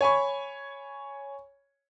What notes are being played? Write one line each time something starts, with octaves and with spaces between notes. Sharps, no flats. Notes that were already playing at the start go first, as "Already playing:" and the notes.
C#5 G#5 B5 C#6